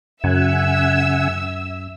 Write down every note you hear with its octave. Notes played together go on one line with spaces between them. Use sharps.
F#2 C#3 E5 F#5 G#5 E6